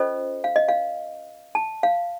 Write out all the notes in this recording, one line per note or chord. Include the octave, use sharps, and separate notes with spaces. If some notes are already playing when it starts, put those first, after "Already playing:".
Already playing: C#4 F4 A4 C5 D#5
F5
D#5
F5
A5
F5